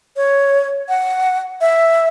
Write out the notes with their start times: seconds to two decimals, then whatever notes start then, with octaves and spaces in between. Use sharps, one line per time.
0.17 C#5
0.89 F#5
1.61 E5